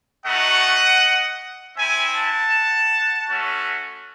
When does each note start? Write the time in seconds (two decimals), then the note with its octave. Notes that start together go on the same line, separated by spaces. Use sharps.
0.25 A3 D#4 F#4 D#5 F#5
1.77 C4 E4 E5 G#5
2.15 F#5 A5
3.29 A3 C#4 F#4